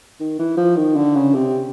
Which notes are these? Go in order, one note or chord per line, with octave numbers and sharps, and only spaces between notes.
D#3
E3
F3
D#3
D3
C#3
C3